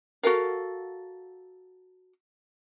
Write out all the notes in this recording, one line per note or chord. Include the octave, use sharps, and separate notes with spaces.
F#4 A4 A#4 F5